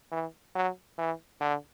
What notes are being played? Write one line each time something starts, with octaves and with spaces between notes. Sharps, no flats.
E3
F#3
E3
D3